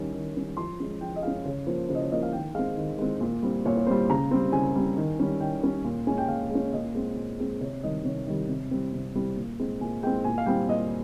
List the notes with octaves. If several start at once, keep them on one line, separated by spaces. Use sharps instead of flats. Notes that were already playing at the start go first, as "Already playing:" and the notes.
Already playing: D#3 G3 C#4
D#3
G3 C#4
F3 C6
G#3 C#4
F3 G5
D#5
G#3 C#4 F5
C#3 C#5
F3 A#3 C5
C#3 C5
D#5
C#5
F3 A#3 D#5
F5
D#3 G5
G#3 C4 F5
D#3
G#3 C4
A#2
G3 C4
A#2 C#5
C#5
G3 C4 C5
C#3 A#5
G3 C4
C#3 G#5
G3 C4
D#3
G3 C#4
D#3 G5
G3 C#4
A#2
G#3 C#4 G#5
G5
A#2 F5
G#3 C#4
A#2 D#5
G#3 C4
A#2
G#3 C4
C3 C#5
D#3 G3 D#5
C3 C#5
D#3 G3
C3
G3 C4
C3
G3 C4
A#2
G#3 C4
A#2 G#5
G#3 C4 G5
A#2 G#5
F5
G3 C4 G5
A#2 D#5